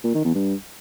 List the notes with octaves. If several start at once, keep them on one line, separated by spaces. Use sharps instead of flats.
A#2
D#3
E2
G2